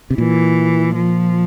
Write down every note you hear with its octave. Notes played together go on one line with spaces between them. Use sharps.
C3
A#2 E3
F3